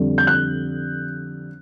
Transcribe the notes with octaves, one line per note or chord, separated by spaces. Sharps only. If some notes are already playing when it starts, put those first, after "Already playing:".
Already playing: F2 D3 G3
G6
F#6